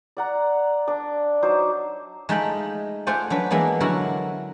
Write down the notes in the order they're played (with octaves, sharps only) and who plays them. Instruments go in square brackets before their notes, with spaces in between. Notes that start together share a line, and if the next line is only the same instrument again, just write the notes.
[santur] D5 F#5 A#5
D4 D5
F#3 D#4 C5 D6
[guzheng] G#3 A3 D#4 F4 G5 B5
A3 F4 C5 D5 F#5 G#5
F#3 D4 B4
E3 G#3 A#3 B3 D4
D3 F#3 E4 F#4 A#4